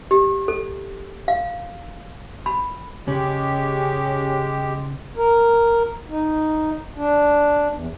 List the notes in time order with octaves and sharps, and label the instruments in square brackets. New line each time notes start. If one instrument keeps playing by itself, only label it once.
[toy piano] G4
A4
F5
B5
[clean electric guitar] C#3 [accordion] G#3 G4 [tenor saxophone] C#4
[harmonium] A#4
D#4
D4
E2